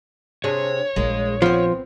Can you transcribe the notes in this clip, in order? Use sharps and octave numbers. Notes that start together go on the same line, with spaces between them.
C3 D4 G#4 C#5
A#1 G#3 A#3
F3 B3 C4